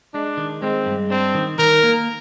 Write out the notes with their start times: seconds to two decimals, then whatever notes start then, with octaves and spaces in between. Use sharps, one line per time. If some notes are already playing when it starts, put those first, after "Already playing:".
0.14 G#3 D4
0.37 D#3
0.62 G#3 C4
0.86 G2
1.10 C4 D4
1.34 D#3
1.58 D#3 A#4
1.83 A#3